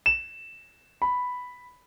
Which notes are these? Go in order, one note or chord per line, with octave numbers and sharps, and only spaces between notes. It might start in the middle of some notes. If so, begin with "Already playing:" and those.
E7
B5